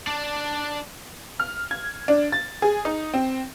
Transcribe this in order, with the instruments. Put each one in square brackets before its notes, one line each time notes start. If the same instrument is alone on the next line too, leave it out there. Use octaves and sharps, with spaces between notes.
[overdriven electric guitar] D4 D5
[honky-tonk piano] F6
G#6
D4
A6
G#4
D#4
C4